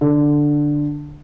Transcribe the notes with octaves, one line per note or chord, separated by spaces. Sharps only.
D3